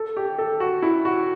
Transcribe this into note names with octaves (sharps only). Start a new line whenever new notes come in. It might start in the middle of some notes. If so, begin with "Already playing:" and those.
Already playing: A4
G4
A4
F#4
E4
F#4